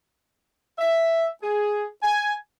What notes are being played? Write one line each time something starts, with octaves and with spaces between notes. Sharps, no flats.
E5
G#4
G#5